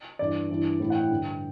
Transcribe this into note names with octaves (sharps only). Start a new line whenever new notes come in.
G2 E3 D5
G2 E3
A2 E3
F#5
G5
G2 D3